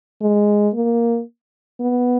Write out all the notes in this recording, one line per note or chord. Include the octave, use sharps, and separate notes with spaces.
G#3
A#3
B3